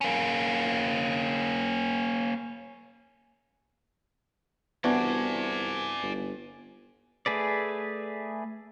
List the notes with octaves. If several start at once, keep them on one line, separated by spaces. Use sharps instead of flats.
A#3 C#4
C2 E3 B3 D4 F#4 D5 G#5
G1
A3 G#4 B4 D5